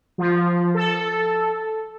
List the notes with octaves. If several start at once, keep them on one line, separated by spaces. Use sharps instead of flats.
F3
A4